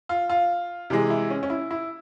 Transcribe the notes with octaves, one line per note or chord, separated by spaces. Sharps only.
F4
F4
C3 E3 G#3
E4
C#4
C#4
E4
E4